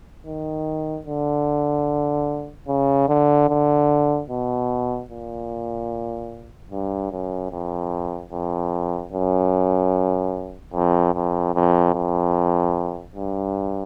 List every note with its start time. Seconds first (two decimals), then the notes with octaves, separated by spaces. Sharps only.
0.26 D#3
1.06 D3
2.68 C#3
3.08 D3
3.49 D3
4.30 B2
5.10 A#2
6.71 G2
7.11 F#2
7.51 F2
8.32 F2
9.13 F#2
10.74 F2
11.15 F2
11.54 F2
11.94 F2
13.16 G2